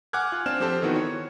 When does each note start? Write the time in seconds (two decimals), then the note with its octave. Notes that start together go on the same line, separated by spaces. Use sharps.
0.13 F#5 G#5 D6 F6 F#6 G#6
0.32 F4
0.46 C4 D4 F6 E7
0.60 F3 C4 G4 A4 C5
0.82 D#3 E3 B3 F#4
0.96 C#5